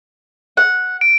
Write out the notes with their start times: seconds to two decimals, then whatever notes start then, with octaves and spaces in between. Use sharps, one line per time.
0.57 F#5
1.01 D7